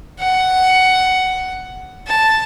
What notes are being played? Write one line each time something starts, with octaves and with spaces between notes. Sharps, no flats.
F#5
A5